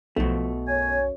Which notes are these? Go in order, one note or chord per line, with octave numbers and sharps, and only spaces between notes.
B1 B2 F3 A3
F#2 C#5 G#5